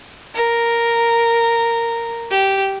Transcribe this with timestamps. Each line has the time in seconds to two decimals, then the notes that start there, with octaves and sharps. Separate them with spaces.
0.35 A#4
2.31 G4